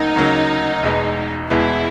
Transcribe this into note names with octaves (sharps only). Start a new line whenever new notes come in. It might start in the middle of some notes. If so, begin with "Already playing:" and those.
Already playing: D2 C#3 F#3 A#3 D#4
D2 C#3 F#3 A#3
E1 E2 B2 G#3 B3
E1 E2 B2 G#3 B3 E4